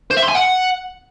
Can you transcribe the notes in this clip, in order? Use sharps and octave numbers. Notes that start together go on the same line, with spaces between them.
C5
E5
C6
G#5
F#5